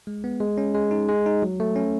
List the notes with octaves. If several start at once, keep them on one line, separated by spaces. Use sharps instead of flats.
G#3
B3
G#3
C#4
G#3
D#4
G#3
D#4
F#3
A3
C#4